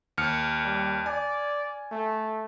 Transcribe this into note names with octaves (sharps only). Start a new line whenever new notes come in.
D#2 F6 C#7
G3
D5 G#5
A3